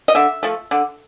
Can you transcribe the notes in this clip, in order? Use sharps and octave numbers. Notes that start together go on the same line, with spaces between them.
D#5
D3 E5
F3 A3
D3